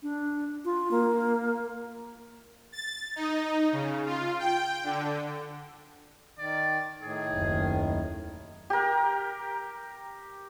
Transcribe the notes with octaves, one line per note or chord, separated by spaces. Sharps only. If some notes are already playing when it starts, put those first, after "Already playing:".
D4
F4
A#3
A6
D#4
C#3
F4
G5
D3
D#3 D5
A2 D#3 G#4
F#1 D#2
G4 A#4